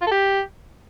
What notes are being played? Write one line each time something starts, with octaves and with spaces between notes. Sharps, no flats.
F4
A4
G4